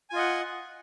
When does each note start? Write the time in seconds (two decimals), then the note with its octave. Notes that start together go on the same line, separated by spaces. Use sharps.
0.10 G#5
0.13 F4
0.16 D#5
0.18 F#5